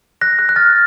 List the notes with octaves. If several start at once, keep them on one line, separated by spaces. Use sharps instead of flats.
F#6 A#6
F#6 A#6
F#6
F6 A6